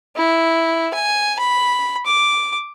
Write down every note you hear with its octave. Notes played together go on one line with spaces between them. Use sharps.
E4
G#5
B5
D6